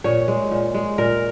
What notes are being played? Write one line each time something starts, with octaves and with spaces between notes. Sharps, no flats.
A#2 C#5
G#3
A#2
G#3
A#2 A#4